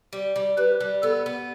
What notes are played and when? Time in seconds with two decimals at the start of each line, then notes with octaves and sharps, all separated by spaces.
0.13 G3
0.36 G3
0.57 G3 B4
0.80 G3
1.03 B3 A4
1.26 B3